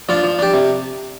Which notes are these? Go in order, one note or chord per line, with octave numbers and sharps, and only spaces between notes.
F3 D4 F4
F3
D4 G4
C3